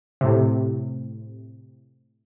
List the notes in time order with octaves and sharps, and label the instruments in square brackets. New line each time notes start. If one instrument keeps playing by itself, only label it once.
[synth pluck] A2 C3